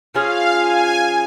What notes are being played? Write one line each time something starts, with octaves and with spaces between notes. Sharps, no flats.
F3 C#4 F4 G#4 F5
G#5